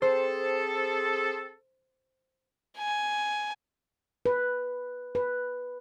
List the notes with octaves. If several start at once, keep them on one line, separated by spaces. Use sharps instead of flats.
C4 G#4 A4 C5
G#5
B4
B4